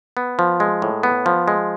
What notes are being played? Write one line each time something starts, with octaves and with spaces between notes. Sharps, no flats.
B3
F3
G#3
A2
B3
F3
G#3